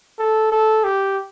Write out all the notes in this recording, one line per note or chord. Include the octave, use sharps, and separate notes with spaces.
A4
A4
G4